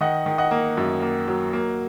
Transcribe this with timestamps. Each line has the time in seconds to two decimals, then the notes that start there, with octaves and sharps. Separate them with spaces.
0.01 D#3 D#5 F#5
0.26 D#3
0.38 D#5 F#5
0.51 A#3
0.77 F#2
1.02 A#3
1.28 F#3
1.53 A#3